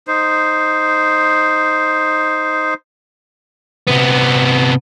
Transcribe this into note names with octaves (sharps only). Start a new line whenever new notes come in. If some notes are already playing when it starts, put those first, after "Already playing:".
D#4 C5
C3 B3